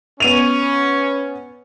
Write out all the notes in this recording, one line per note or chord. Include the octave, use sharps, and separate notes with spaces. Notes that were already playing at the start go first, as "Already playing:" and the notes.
B3 C#4 D#7 F7